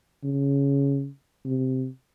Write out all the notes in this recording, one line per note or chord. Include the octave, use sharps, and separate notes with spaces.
C#3
C3